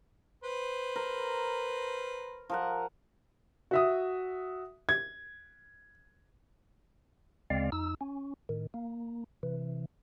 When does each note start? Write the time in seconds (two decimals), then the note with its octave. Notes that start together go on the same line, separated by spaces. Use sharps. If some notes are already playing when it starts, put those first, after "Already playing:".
0.43 B4 C5
0.96 A#4
2.49 F3 A#4 F#5
3.71 F#4 E5 D#6
4.89 G#6
7.50 D2 C#3 G#3 C4 D5 F5
7.72 F2 D#4 E6
8.01 C#4
8.49 A2 D#3
8.74 A#3
9.43 C3 E3